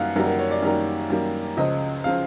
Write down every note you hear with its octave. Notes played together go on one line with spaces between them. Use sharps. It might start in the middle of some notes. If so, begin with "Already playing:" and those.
Already playing: F#2 D#3 G3 A#3 F5 F#5
F#2 D#3 G3 A#3 A#4
A#4
C#5
D5
F#2 D#3 G3 A#3
F#2 D#3 G3 A#3
C#2 C#3 F3 D#5
C#3 F3 F5